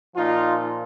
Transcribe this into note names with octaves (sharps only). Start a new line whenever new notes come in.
A#2 F3 D#4 F4